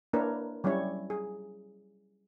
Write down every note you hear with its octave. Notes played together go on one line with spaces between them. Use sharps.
A#3 D4 E4 A#4 B4 C#5
F#3 G3 C#4 E4 C#5
G#4